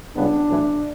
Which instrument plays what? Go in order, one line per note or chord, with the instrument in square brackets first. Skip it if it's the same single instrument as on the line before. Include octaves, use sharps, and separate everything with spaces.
[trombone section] C#2 C#3 G3 B3 D4
B1 A2 E3